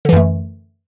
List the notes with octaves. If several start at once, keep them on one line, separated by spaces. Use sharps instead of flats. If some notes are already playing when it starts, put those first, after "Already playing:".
F#2 D3 E3 A3